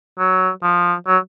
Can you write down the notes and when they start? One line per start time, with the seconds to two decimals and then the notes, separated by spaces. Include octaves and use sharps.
0.18 F#3
0.63 F3
1.07 F#3